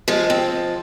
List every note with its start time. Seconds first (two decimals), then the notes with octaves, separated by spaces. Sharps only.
0.08 F3 G#3
0.30 C4